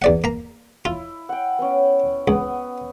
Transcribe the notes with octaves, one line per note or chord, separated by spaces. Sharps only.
E2 D5 F#5
A#3 A#5
E4 F4
F#5 G5
B3 C#4
C#2 B3 D#6